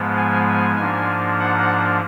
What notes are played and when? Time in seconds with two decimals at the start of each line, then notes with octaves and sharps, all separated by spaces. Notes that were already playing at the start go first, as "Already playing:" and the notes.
Already playing: G#2 F3 G#3 B3
0.17 G#5
0.48 G#5
0.78 G#2 F3 A#3 D4
1.39 F#5